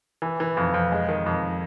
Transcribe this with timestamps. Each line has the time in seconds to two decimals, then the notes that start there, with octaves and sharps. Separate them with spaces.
0.22 E3
0.40 E3
0.57 F2
0.74 F2
0.92 G#3
1.08 D#3
1.26 F2